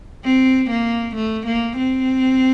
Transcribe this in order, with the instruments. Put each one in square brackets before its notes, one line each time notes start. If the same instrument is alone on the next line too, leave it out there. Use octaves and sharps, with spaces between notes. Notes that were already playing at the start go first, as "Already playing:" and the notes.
[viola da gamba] C4
A#3
A3
A#3
C4